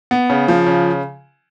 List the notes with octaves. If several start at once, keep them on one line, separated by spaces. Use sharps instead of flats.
B3
C#3
F3
C#3